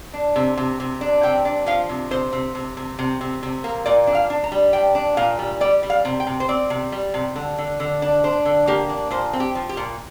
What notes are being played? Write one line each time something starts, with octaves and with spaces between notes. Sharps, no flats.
D4
C3
C3
C3
D4
C3 G5
D4
F3 F5
C3
C3 C5
C3
C3
C3
C3
C3
C3
A#3
A#2 D5
D4
F5
D4
A#5
G3
D4 G5
D4
A#2 F5
G3
G3 D5
G3
F5
C3
G5
C3
C5
C4 D5
C3
G3
C3
D3
D3
D3
D4
D4 C5
D3
A#3 G4
D4
A#2 C5
C4
G4
F3
G4
A#2